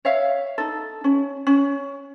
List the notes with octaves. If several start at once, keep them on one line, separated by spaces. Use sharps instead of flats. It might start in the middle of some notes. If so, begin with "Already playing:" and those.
C#5 E5 F5
D#4 A4
C#4
C#4